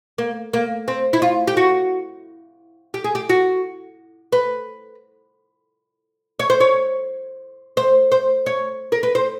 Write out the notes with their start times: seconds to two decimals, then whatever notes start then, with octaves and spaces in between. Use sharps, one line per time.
0.18 A#3
0.53 A#3
0.88 C4
1.13 E4
1.22 F4
1.48 G4
1.57 F#4
2.94 G4
3.04 G#4
3.15 G4
3.29 F#4
4.32 B4
6.40 C#5
6.50 C5
6.60 C#5
7.77 C5
8.12 C5
8.46 C#5
8.92 A#4
9.03 B4
9.15 C5